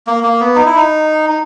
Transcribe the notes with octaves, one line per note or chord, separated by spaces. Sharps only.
A#3
A#3
B3
D#4
E4
D#4
D#4